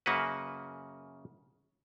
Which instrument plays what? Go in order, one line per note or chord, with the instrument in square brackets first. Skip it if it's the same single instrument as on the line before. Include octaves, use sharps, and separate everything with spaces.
[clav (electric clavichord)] F#2 C#3 A#3 F#4 B4